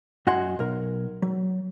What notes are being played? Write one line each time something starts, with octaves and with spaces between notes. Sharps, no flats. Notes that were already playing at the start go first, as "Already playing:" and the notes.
F#2 F#4 D#5 F#5 G#5 C6
B1 A#4
F#3